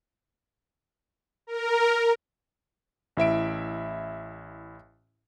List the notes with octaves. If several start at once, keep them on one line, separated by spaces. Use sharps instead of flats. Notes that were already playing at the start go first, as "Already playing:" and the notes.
A#4
A1 E4 E5 D7